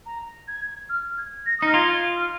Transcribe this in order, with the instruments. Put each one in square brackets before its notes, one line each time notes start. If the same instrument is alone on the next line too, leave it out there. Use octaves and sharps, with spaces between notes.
[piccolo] A#5
G#6
F6
G#6
A#6
D#6
[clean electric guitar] D#4 [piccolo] F6
[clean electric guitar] F4 [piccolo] G#6
[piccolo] F6